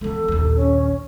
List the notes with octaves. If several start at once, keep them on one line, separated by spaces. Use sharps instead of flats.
E3 B3 A4
A#1 D#2
C#4